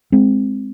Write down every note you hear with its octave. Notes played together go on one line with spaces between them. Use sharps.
G#3 C4